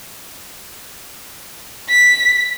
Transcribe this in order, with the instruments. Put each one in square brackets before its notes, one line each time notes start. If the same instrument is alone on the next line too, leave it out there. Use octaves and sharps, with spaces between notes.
[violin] B6